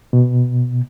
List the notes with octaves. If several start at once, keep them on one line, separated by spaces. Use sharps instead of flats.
B2